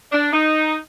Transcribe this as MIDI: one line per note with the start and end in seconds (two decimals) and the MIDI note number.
0.12 0.32 62
0.32 0.76 63